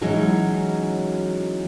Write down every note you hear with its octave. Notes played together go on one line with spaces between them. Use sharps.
E3 F#3 G#3 C#4 D#4 F#4